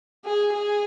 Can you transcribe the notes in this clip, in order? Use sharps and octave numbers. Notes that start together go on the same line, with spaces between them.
G#4
G#4